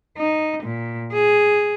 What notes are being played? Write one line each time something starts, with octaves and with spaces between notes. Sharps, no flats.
D#4
A#2
G#4